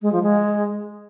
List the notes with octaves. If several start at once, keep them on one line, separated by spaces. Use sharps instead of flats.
G#3
F3
G#3